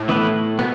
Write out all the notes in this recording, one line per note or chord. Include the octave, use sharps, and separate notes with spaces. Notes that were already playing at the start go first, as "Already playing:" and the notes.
Already playing: A2
E3 B3 E4 B4
B2 B3